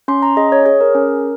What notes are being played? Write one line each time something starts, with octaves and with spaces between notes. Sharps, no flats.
C#4 C6
A#5
G#4 D#5
C#5
G#4 C#5
A#4
C#4